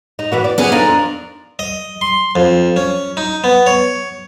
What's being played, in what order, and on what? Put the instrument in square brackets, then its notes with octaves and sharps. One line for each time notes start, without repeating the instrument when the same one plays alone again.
[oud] D#4
E3 B3 F#4
D5
[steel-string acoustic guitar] B3 C#4 G#4
[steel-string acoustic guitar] D4 A#4 [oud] D#4 F4 A4
[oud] F2
[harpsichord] D#5
C6
F2
C#4
D#4
B3
C#5